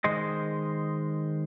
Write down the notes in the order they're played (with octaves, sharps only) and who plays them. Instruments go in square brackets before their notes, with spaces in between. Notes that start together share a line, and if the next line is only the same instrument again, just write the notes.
[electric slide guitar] D#3 G#3 C5 D#5